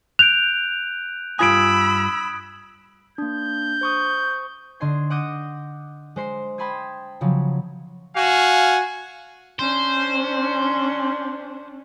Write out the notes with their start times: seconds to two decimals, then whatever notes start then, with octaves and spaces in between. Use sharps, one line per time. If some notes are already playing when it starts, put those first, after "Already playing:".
0.19 F#6 G6 D7 F7
1.39 G2 F4 G#5 B5 D#6 E6 G#6 D7
3.18 A#3 D4 G6
3.81 C5 C#6 D#6
4.80 D3 D4 D#5 C6 G#6
5.10 F#5 D6 D#6 G6 A#6
6.16 G#3 C5 C7
6.58 G5 A5 B5 C6 D#6 G#6
7.21 C#3 F3 F#3
8.16 F#4 F5 G#5
9.59 C#4 D4 C5